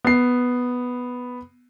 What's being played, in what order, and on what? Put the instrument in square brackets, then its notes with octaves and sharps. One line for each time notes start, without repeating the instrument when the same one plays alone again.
[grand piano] B3 C7